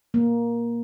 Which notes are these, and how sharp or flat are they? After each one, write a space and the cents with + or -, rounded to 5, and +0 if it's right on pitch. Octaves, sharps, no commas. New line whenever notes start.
A#3 +10